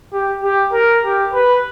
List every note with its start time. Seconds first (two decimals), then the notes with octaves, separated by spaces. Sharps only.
0.13 G4
0.43 G4
0.72 A#4
1.03 G4
1.33 B4